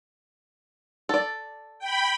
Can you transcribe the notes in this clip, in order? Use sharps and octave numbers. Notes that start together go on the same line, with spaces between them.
A4 D5
G5 B5